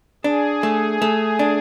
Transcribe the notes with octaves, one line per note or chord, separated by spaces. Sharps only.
D4 G#4
A3
A3
D4